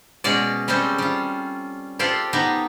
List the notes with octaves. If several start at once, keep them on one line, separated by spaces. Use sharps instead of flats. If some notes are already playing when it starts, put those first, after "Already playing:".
B2 G#3 C#4 G#4 D5
G3 G#3 C4 C#4 A4 C5
G3 F4
F4 G4 A4 C5 D5 F5
B3 D#4 G4